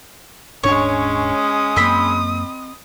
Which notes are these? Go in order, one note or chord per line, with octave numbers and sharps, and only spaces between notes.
D#1 G#2 G#3 C#4 D4 C#5
D#6
F#2 A#3 C4 D#5 B5